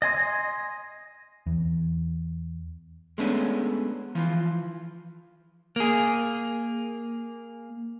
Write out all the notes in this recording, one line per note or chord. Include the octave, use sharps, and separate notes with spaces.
D#5 G#5 C6
E2
G#3 A3 B3 C#4 D4
E3 F3 F4
A#3 G#4